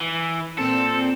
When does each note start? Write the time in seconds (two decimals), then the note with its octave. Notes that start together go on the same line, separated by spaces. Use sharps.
0.01 E3
0.58 A#2 C4 A4